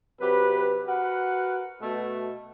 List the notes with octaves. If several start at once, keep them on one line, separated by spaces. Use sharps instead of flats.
C3 F#3 G4 B4
F#4 A#4 B4 F#5
B2 A3